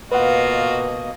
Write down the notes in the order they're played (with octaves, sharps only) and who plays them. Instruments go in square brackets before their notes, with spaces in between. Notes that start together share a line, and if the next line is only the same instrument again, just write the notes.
[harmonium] B2 A#3 D#5 [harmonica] F4 F#4 [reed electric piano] B4 F#5